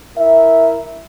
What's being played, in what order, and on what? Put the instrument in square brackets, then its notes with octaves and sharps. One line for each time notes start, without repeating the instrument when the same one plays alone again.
[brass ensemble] E4 A#4 E5